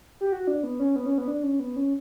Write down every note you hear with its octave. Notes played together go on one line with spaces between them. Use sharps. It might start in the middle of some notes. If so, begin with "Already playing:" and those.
G4
F#4
D4
B3
C#4
B3
C#4
B3
D4
C#4
B3
C#4